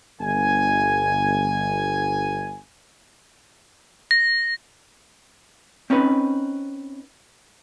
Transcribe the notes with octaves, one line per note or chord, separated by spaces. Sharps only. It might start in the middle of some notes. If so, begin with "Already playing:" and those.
G1 G#5
A#6
C4 C#4 D#4 B4